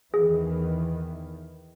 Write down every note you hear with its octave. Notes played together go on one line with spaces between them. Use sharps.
E2 D#3 E3 G#4